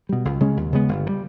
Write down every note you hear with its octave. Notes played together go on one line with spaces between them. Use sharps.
B2 G3
C#2
C#3 G#3 C#4
D#2
C#3 G#3 B3
G1
D#3 G3